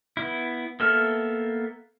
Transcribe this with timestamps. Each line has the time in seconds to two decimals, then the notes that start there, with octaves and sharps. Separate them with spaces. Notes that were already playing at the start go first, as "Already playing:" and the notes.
0.17 B3 E4
0.80 A#3 B3 A4 E5 F6